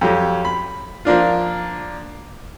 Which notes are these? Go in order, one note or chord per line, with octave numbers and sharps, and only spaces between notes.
F2 F#3 G4
B5
F3 A#3 D4 F4